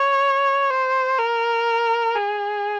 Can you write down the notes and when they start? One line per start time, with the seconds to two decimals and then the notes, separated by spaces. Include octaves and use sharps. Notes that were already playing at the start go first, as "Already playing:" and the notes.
Already playing: C#5
0.70 C5
1.19 A#4
2.16 G#4